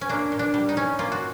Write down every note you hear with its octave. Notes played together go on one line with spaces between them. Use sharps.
C#4
A#3 D4
A#2
D4
G3
D#4
C#4
A#3 F4
F#4